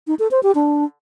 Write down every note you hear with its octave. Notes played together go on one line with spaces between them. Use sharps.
D#4
A4
C5
G4
D4